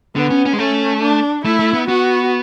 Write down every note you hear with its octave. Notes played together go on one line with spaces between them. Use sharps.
D3 B3
C#4
C#4
G#3
A3 C#4
D4
A3 E4
A3
B3
B3 F#4